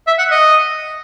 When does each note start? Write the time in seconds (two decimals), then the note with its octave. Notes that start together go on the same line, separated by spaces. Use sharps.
0.07 E5
0.19 F#5
0.31 D#5